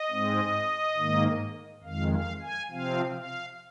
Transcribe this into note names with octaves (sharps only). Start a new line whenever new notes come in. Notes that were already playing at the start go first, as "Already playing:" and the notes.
Already playing: D#5
G#2 G#3 C4
G#2 D#3 A#3
F2 D#3 G#3 F5
F5
G#5
C3 F3 C4 F5
F5